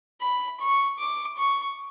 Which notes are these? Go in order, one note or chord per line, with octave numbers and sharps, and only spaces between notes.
B5
C#6
D6
C#6